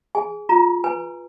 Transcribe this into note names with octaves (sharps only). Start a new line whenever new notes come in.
G#4 G#5
F4 A#5
B4 G#5